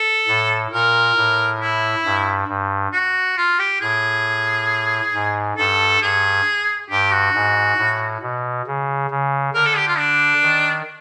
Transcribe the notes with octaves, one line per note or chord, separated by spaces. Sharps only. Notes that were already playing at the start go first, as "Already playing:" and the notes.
Already playing: A4
A2
A#2 A#4
A2
E4
G2
G2
F#4
F4
G4
A2 G#4
G#2
G2 A4
G2 G#4
G2 G4
F#4
G#2
A2
B2
C#3
C#3
D3 A#4
A4
G4
F4
D4
D#3